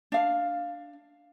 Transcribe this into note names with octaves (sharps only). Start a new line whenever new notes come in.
D4 F5